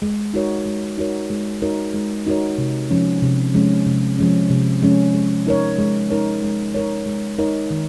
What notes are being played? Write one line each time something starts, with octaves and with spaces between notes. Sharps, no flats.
G#3
D#4 F#4 A#4 C#5
G#3
D#4 F#4 A#4 C#5
G#3
D#4 F#4 A#4 C#5
G#3
D#4 F#4 A#4 C#5
C3
F3 G#3 C#4
C3
F3 G#3 C#4
C3
F3 G#3 C#4
C3
F3 G#3 C#4
G#3
D#4 A#4 C#5
G#3
D#4 A#4 C#5
G#3
D#4 A#4 C#5
G#3
D#4 A#4 C#5
D#3